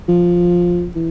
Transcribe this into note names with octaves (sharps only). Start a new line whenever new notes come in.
F3
E3